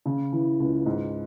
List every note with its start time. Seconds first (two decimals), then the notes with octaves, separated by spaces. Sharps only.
0.06 C#3
0.32 E3
0.60 C#2
0.86 G#2